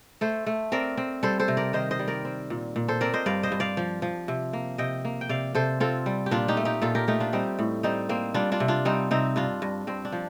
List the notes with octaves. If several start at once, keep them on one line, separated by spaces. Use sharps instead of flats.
A3 A4 C5
A3
C4 A#4 D5
C4
G3 A4 C5
A4 C5
C3
A#4 D5
D#3 C5 D#5
C5 D#5
G3
A#4 D5
C4
A#2
A#2
A4 C5
C4 A#4 D5
C5 D#5
G2 D5 F5
C5 D#5
G2
D5 F5
F3
F3
C3
A#3
C3 D#5 G5
A#3
G5
C3 D5 F5
C3 A4 C5
C4 F4 A4
G3
G4
A#2 D4 F4
D#4 G4
A3
D#4 G4
A#2 F4 A4
G4 A#4
A3 D#4 G4
D4 F4
G3 C4 D#4
A2
G3 C4 D#4
A#3 C4
G3 D4 F4
D4 F4
C3
D4 F4
G3 C4 D#4
C3 C4 D#4
G2 D4 F4
G2
G2 C4
D4
F3